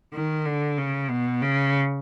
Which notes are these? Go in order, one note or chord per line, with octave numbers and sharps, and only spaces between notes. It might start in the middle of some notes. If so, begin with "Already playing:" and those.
D#3
D3
C#3
B2
C#3